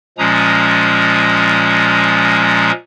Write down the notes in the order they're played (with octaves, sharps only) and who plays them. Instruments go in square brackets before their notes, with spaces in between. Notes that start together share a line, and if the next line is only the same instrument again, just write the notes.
[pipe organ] A#2 F3 G#3 C#4 A#5 D#6